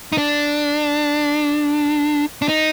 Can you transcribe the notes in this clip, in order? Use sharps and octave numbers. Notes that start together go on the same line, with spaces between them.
D#4
D4
D4
D#4